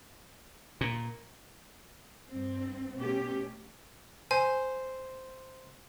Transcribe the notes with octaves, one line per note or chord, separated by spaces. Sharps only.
A#2
G2 C4
B2 A3 C#4 G4
C5 G#5